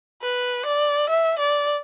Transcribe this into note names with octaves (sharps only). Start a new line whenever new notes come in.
B4
D5
E5
D5